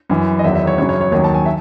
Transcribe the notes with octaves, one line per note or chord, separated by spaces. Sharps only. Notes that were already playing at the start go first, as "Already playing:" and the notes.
F#2 E3
D#5
E2 D#3 F#3 E5
E5
C#5
F#2 C#3 F#3 C#5
C#5
C#5
D#2 D#3 F#3 C#5
A5
G#5
E5